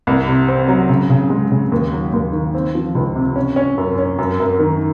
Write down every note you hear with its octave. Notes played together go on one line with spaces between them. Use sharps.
C2
C3
C4
F#3
C#3
C#3
G#3
C#3
D#2
F#3
D#2
D#3
C4
F3
C#2
C3
C#4
C#4
F#2
C#4
F#2
F#2
D#3